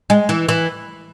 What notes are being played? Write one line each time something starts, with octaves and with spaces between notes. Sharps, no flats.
G#3
E3
E3